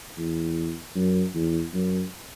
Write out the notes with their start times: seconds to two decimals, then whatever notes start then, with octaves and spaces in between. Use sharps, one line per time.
0.17 E2
0.95 F#2
1.34 E2
1.74 F#2